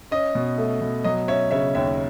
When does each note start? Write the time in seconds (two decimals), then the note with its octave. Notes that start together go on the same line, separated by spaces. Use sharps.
0.11 C#4 D#5
0.35 B2
0.58 A3
0.81 B2
1.04 F#3 D#5
1.28 C#4 C#5 E5
1.51 C#3 C#5 E5
1.75 D#2 C#5 E5